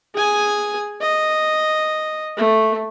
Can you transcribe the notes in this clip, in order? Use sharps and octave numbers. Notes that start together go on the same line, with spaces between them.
G#4 G#5
D#5
A3